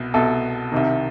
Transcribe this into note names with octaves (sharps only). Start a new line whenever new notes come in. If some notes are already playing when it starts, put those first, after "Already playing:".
Already playing: C2 B2
C2 B2 A4
C2 C3 D#3